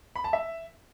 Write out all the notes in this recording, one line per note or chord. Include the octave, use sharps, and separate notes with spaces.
B5
A5
E5